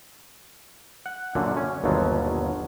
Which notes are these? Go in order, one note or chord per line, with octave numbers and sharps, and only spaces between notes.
F#5
F#2 A#2 D3
C#4
G1 D#2 B2 F3 F#3